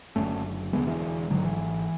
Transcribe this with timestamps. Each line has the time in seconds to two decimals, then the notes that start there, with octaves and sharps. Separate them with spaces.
0.16 F#1 F#2 D3 A3 C#4
0.73 E1 D2 D3 G#3 B3
0.87 E3 G#3
1.30 G#1 G#2 D3 F#3
1.44 E3